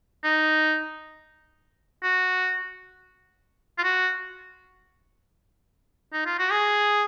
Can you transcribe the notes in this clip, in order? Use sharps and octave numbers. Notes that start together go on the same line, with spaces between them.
D#4
F#4
F4
F#4
D#4
F4
F#4
G#4